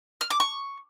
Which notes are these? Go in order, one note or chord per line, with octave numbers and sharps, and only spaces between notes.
F6
D6
C#6